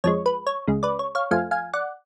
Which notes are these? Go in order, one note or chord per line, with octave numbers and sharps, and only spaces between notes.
F2 F3 G#3 C#5
B4
C#5
C#2 C#3 G#3
B4 D5
C#5
C#5 F5
F2 F3 A3 F5 G#5
F5 G#5
D5 F#5